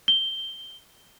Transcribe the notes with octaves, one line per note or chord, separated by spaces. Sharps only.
G7